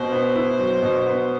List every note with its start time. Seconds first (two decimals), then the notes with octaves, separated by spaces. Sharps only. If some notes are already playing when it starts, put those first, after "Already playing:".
Already playing: B2 C5
0.12 B3
0.36 E4
0.59 F#3
0.82 B2
1.06 B3